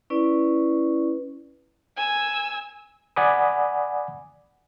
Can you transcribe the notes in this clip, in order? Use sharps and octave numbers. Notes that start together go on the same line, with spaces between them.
C#4 E4 B4 D5
G#5 E6
D5 F#5 G#5 B5 D6 D#6